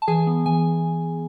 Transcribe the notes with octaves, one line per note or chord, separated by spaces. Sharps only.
A5
E3 G#4 G#5
B3
E3 G#5